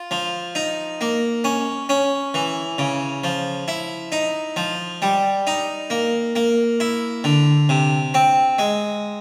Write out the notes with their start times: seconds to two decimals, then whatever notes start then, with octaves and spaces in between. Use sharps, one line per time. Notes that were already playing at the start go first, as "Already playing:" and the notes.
Already playing: F4
0.11 F3
0.55 D#4
1.01 A#3
1.44 C#4
1.89 C#4
2.34 E3
2.78 C#3
3.24 F3
3.68 E4
4.12 D#4
4.56 F3
5.02 G3
5.47 D#4
5.90 A#3
6.36 A#3
6.80 E4
7.24 D3
7.69 C3
8.14 C4
8.59 G#3